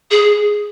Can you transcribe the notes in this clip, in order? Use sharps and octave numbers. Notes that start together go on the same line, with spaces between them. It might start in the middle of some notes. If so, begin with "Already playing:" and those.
G#4